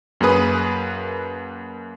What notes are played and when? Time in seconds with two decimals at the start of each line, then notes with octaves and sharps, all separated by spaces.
0.21 F#2 A#3 G#4 B4 D#6